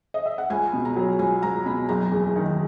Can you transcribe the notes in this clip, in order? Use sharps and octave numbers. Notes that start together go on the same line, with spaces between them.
D#5
E5
F#5
C#2 G#5
B2
A#5
F#3
C#2 G#5
C#2 A#5
B2 B5
F#1 A#5
E2
D#3